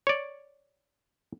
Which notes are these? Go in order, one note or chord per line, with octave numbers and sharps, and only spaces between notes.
C#5 D5